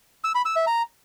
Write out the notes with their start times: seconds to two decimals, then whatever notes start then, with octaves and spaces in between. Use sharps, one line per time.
0.24 E6
0.35 B5
0.46 E6
0.56 E5
0.67 A#5